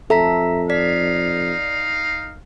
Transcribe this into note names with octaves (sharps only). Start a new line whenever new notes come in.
F2 A4 E5 A#5 B6
D#4 D5 F5 B6